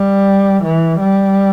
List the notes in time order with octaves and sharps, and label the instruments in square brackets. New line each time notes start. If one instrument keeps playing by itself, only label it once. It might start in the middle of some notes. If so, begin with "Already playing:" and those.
Already playing: [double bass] G3
E3
G3